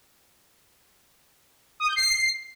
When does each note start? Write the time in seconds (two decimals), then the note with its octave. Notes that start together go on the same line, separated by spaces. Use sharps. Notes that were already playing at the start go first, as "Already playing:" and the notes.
1.80 D#6
1.88 G6
1.96 C7